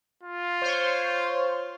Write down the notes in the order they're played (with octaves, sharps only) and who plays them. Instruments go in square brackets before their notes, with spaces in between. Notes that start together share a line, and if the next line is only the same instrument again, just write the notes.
[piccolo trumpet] F4
[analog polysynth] C5 C#5